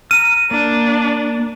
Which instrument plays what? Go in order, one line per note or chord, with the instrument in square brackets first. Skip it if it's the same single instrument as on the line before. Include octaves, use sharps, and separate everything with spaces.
[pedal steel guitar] A#5 F6 [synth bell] D#7
[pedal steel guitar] A#3 [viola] D4